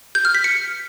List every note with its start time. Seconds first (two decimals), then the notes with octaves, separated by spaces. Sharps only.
0.15 G6
0.25 F6
0.35 B6
0.44 C#7